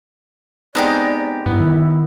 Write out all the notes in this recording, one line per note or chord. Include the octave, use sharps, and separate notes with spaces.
G#3 B3 C4 D4 D#4 G4 D5
G2 B3 E4
D#3